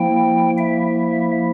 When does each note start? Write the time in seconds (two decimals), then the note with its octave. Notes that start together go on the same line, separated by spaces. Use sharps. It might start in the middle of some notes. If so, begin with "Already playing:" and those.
Already playing: F3 A#3 E4 G5
0.58 E5